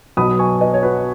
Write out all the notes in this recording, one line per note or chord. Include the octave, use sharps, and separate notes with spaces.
B1 B2 B3 B5 D#6
G#5 C#6
B4 D#5
C#5
F#4 B4